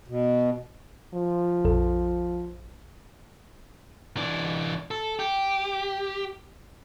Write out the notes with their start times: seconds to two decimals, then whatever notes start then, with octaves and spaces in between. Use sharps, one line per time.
0.08 B2
1.14 F3
1.65 A#1 F2 A4
4.17 E3 D4
4.91 A4
5.19 G4